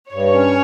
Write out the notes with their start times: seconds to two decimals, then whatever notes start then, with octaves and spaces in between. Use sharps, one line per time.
0.13 G2 C#5
0.34 C#4